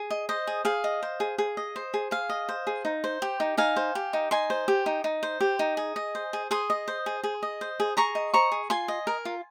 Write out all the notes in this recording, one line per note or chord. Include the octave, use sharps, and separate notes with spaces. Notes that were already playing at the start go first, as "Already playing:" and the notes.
Already playing: G#4
D#5
C5 D#5
G#4
G#4 F5
D#5
C5
G#4
G#4
D#5
C5
G#4
G#4 F5
D#5
C5
G#4
D#4
C5
G4
D#4
D#4 F5 G#5
C5
G4
D#4
D#4 G#5 C6
C5
G4
D#4
D#4
C5
G4
D#4
G#4
D#5
C5
G#4
G#4 C6 D#6
D#5
C5
G#4
G#4
D#5
C5
G#4
G#4 A#5 C#6
D#5
C5 A#5 C#6
G#4
F4 G#5 C6
D#5
A#4
F4